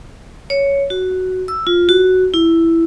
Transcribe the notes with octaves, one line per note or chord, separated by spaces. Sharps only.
C#5
F#4
E6
F4
F#4
E4